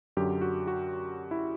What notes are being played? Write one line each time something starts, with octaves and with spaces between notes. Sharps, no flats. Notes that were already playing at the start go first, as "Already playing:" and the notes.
F#2 D3 F#3 G4
F#4
F#4
E4